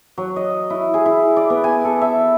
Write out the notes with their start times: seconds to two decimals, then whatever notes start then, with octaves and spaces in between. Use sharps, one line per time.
0.18 F#3
0.36 D#5
0.70 E4
0.94 G#4
1.06 E4
1.37 D5
1.50 B3
1.64 G#5
1.85 A4
2.02 E5